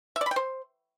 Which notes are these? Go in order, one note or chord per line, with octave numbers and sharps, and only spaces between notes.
E5
D5
B5
G5
C5